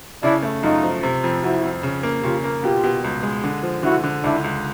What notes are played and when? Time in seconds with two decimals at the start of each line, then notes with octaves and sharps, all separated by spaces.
0.23 C#3 D4 E4
0.43 A3
0.63 F#2 D#4 F4
0.83 F3
1.03 C3
1.24 F2
1.43 F2 E4 F#4
1.63 F2
1.83 C#3
2.03 A#3
2.23 C#3 F4 G4
2.44 A#3
2.63 B2 F4 G4
2.84 B2
3.04 C#2
3.23 G#3
3.44 D3
3.63 F3
3.83 D3 E4 F#4
4.04 D3
4.24 C#2 D4 E4
4.44 C#2